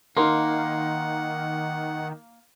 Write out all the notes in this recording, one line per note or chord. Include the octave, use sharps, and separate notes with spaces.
D#3 A#3 D#4 A#4 F#5 C6